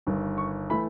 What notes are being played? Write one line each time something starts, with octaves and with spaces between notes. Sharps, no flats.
G1 G2 D#3
C#6
E3 A3 B5